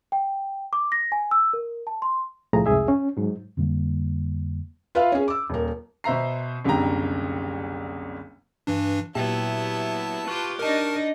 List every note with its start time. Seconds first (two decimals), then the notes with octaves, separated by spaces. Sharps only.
0.12 G5
0.73 D6
0.92 A#6
1.12 G#5
1.31 E6
1.53 A#4
1.87 A5
2.02 C6
2.53 C2 A2 F3 A3 G#4 A#5
2.66 C2 F2 G#2 G#4 E5
2.88 C#4
3.17 G#2 F#3
3.57 F2 D3 G3 A#3
4.95 F4 B4 E5 F5
5.12 C#4 G#4
5.28 D6 E6
5.50 D#1 A#4
6.04 B2 C5 E5 A#5 C7
6.64 F#1 C2 D3 G3 G5 A#5
8.67 G2 E3 D4
9.15 A#2 F#3 B3 E4 G4 E5 A5
10.27 F4 G4 B4 C#6 F#6
10.59 D4 D#4 A#4 D#5 A5